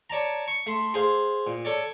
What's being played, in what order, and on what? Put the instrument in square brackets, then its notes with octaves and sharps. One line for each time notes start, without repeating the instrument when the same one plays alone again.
[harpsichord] C#5 D5 A5 A#5
C#6
A3 C6
G#4 C5 F5
A#2
A4 C#5 D5